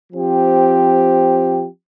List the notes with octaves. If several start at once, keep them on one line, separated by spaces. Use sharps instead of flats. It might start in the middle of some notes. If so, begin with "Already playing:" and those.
F3 C4 G4